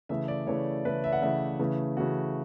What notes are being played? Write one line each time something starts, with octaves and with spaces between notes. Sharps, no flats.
C#3 E3 A3 E5
D5
C#3 E3 A3 C#5
C#3 E3 A3 B4
E5
F#5
C#3 E3 A3 E5
C#3 E3 A3
C#3 E3 A3 F#4